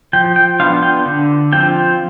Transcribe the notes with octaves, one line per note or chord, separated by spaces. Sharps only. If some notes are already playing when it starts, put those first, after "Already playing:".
F3 G5
G5
B3 D4 F4 F5
G5
D3
F3 C4 F4 G5